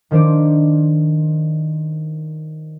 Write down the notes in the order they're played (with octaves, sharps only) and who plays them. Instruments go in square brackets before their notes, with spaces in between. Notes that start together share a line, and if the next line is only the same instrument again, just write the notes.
[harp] D#3 F3 D4 C5 D5